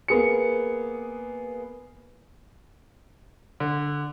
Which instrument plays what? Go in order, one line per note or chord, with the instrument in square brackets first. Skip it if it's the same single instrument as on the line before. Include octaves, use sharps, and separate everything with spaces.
[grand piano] A#3 B3 G#4 C#7
[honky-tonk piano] D3